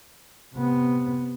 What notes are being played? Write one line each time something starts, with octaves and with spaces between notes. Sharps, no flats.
C3 B3